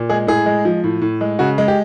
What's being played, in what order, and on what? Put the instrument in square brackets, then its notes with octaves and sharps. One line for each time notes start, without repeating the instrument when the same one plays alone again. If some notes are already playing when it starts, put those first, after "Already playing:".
Already playing: [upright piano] A#2
G#3 G#4
A2 G#4
G#3
F3
A2
A2
G#3
C#3 F#4
G#3
G4